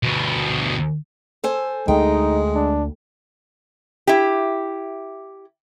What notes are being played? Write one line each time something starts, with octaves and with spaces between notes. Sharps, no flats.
D2 B2
A4 C5 G#5
D2 G#3 A3 D#4 G5
D4
E4 G4